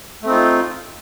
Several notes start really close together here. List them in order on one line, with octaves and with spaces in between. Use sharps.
A3 C4 D#4 F4